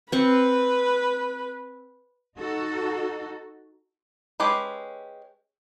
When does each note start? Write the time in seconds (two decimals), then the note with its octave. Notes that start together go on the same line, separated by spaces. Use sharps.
0.12 C4 B4 C#6
2.38 D#4 F#4 A4
4.40 G#3 C#4 G4 B4